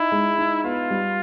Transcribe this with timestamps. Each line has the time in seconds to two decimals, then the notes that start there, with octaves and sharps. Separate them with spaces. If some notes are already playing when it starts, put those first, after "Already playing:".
Already playing: D#4 E4
0.12 G#3
0.38 D#4
0.64 B3 F4
0.91 G3